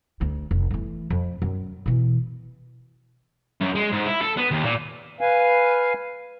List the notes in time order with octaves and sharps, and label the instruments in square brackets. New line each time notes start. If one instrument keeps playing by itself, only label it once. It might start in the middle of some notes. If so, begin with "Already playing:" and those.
[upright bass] D2
F1
E3 A3
F2
F#2
B2 E3
[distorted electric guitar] F#2
G#3
G#2
E4
A4
B3
D#2
A#2
[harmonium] B4 F5 G#5